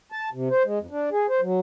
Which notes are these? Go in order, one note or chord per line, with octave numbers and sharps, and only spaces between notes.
A5
C3
C5
G#3
F2
D4
G#4
C5
F#3